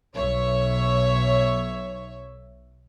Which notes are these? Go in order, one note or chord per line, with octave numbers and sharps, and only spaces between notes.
B1 C#5 E5